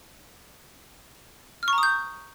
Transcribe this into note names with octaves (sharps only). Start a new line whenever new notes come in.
F6
C#6
A#5
D#6
G6